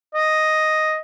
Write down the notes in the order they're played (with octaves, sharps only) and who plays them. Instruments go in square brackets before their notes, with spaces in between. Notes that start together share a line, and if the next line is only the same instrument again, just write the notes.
[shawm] D#5